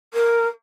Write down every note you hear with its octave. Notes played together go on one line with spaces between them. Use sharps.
A#4